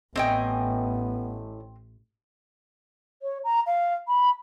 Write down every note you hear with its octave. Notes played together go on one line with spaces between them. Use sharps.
A1 A2 B3 C4 D#5 G5 G#5
C#5
A#5
F5
B5